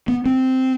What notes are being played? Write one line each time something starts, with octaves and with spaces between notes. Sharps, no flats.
B3
C4